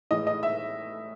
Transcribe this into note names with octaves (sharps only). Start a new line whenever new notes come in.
A2 E3 G#3 D#5
D#5
E5